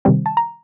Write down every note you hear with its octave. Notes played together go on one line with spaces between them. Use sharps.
C3 D#3 G3 C4
A5
A#5